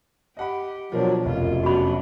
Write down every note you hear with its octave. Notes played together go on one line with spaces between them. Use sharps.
G4 D#5 F#5 B5
B2 F3 F#3 D4 A#4 C5
F1 F#2 F4
F#3 B3 D4 F#4 B5